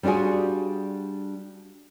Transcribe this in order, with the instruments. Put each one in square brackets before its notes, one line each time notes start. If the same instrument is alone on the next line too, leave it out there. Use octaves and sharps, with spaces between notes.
[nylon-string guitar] G3 D4 F4 F#4 G#4